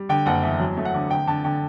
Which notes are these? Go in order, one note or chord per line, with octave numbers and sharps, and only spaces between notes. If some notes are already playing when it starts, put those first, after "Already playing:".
Already playing: G3
D3 G5
F#1 F#5
E2 E5
F#3
A3
F#5
D3
D3 G5
D3 A5
D3 G5